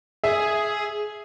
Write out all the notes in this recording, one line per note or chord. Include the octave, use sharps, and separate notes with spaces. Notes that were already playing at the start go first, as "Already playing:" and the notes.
G#4 E5